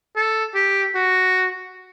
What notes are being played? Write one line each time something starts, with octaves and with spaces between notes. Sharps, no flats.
A4
G4
F#4